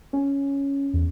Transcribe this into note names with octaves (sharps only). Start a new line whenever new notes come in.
C#4
E2